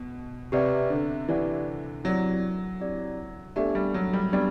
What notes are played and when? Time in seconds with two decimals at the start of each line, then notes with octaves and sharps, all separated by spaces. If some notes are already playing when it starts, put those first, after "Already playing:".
Already playing: B2
0.52 C3 G4 B4 D5 F#5
0.90 D3
1.28 E3 G4 B4 D5 F#5
2.04 F#3 C4 E4 G4 D5
2.81 C4 E4 G4 D5
3.56 A3 B3 D4 G4 D5
3.75 G3
3.94 F#3
4.13 G3
4.33 G3 B3 D4 G4 D5